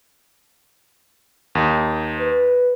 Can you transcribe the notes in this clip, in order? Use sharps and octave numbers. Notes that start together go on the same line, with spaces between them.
D#2 D#4
B4